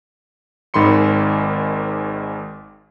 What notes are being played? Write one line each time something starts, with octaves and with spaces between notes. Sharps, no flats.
G#1 G#2 D#3 B5 C6 C#7